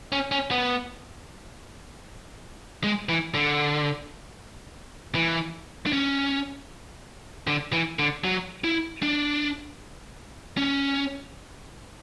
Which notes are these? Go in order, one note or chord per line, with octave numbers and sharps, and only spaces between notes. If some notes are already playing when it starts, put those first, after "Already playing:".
C#4
C#4
B3
G#3
E3
D3
E3
D4
C#4
D3
E3
D3
F#3
E4
D4
C#4